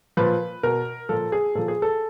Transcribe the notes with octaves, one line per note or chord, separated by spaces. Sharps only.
A#2 F3 B4
B2 A#4
A#2 F3 A4
G#4
A#2 F3 A4
G#4
A4